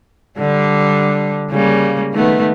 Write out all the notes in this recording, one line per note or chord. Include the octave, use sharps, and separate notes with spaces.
D3 G3 D4
C#3 G3 A#3
D#3 A3 B3